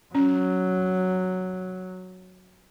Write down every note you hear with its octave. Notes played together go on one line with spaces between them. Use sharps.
F#3 C#4